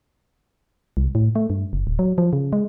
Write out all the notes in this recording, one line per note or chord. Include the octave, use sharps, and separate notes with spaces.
C2
A2
A3
G2
F#1
D1
F#3
F3
C#3
G#3